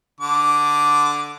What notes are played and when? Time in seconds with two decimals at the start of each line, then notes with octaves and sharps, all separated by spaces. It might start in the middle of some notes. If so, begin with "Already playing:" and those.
0.21 D3 D6